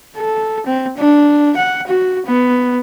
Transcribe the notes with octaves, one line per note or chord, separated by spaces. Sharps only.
A4
C4
D4
F#5
F#4
B3